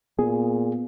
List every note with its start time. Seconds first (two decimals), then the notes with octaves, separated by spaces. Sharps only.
0.19 A#2 B3 G#4